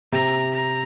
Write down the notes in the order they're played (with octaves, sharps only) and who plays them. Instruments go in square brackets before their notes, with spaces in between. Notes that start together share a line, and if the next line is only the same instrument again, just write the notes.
[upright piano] C3 [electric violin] A#5
[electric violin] A#5